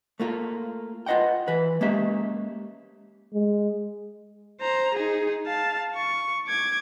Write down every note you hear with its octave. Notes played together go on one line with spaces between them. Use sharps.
A3 A#3 F4
F4 B4 D#5 F#5 G5
E3 B4
G#3 A#3 C#4 G4 E5
G#3
C5 A#5
D#4 G#4
F5 A5
C#6
D6 G#6